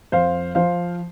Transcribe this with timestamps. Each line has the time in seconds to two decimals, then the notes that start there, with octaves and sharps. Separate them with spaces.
0.12 F2 C5 F5
0.55 F3 C5 F5